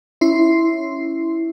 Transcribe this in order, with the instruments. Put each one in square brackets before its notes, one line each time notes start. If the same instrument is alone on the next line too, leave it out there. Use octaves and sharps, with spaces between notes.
[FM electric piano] C#4 E4 C6 C7